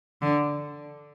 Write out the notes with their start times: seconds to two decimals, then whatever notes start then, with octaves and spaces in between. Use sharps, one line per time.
0.22 D3